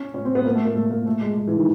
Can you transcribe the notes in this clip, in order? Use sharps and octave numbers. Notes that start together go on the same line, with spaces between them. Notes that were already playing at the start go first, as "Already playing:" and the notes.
Already playing: C#4
C#4
C4
B3
A#3
A3
A#3
A3
A#3
A3
G#3
G#3
E3
D#3